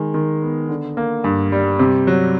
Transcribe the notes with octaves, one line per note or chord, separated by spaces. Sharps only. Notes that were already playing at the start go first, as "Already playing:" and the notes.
Already playing: D#3 G#3
D#3
B3
D3
A#3
G2
G3
C3
F#3